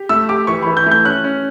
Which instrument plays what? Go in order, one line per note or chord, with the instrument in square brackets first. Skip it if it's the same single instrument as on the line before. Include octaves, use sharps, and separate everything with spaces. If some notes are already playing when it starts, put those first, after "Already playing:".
Already playing: [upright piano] G4
[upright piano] A3 [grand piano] E6
[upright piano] G4 [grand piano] D6
[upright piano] E3 [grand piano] C#6
[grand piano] B5
[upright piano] E3
[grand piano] G6
[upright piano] A3
[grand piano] G6
[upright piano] C#4 [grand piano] F#6
[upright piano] C#4